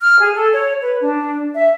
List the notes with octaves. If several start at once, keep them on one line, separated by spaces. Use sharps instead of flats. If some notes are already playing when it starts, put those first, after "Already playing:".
F6
G#4
A4
C#5
B4
D4
E5